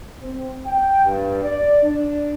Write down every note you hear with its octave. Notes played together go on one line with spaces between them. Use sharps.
C4
G5
G2
D5
D4